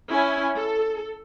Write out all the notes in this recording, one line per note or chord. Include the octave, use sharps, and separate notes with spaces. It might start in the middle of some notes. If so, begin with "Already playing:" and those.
C#4 E4 G#5
A4